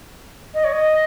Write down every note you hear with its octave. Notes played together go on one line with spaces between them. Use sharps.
D#5
C#5
D#5